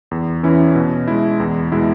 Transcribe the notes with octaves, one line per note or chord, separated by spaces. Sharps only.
E2
E3 C#4 E4
B2
G#3 E4
E2
B2 G#3 B3 E4